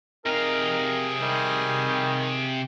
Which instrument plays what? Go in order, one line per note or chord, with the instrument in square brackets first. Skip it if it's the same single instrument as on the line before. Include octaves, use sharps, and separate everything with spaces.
[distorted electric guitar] C3 F5 [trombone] D#4 [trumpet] G#4 [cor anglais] A#4
[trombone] D#3 [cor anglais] G3